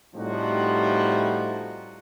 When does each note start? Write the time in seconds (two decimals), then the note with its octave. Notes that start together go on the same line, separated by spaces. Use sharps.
0.15 A2 C3 F3 G3 D#4 F#4